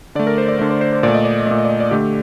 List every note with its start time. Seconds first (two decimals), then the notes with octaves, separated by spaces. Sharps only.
0.15 D3 A3 D5
0.27 A#4
0.38 C5
0.48 D5
0.59 D3 A3 C5
0.70 C5
0.81 C5
0.92 C5
1.03 A#2 A3 D5
1.14 D#5
1.25 D5
1.47 A#2 A3 D5
1.58 D#5
1.65 D5
1.69 D#5
1.80 D5
1.91 D3 A3 G4